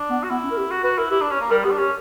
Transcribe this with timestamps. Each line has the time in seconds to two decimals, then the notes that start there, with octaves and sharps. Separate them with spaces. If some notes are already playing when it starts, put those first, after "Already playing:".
Already playing: D4
0.10 B3
0.23 F#4
0.30 B3 E4
0.44 C#4
0.51 A#4
0.57 G4
0.71 F#4
0.83 F#4 B4
0.98 E4 A#4
1.11 E4 G4
1.21 D4
1.31 C#4
1.41 A#3
1.51 G3 A#4
1.64 B3 G4
1.71 D4
1.78 C#4 G4